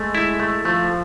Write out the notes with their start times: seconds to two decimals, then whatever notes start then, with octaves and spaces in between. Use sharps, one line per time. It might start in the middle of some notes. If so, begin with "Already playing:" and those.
Already playing: G#3 A3
0.15 E4
0.40 A3
0.65 F3 A3